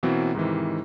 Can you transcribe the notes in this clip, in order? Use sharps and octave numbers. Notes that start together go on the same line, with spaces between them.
B2 E3 F#3 A#3 C4
G#2 C3 D#3 E3